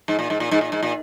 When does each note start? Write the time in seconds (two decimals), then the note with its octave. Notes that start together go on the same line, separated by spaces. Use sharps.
0.08 G#2
0.19 A#2
0.30 G#2
0.40 A#2
0.51 G#2
0.61 A#2
0.72 G#2
0.83 A#2